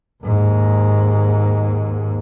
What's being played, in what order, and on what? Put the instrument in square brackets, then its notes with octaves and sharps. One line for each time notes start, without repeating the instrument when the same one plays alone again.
[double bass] D#2 G#2